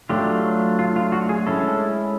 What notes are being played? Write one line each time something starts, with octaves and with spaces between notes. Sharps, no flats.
F#3 A3 D4 F4 G4
F4
F4
F#4
G#4
G#3 C#4 E4 A4